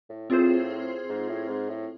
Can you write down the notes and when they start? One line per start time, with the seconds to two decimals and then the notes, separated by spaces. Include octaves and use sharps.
0.10 A2
0.30 A2 C4 F4 G#4 C5
1.09 G#2
1.28 A2
1.48 G#2
1.69 A2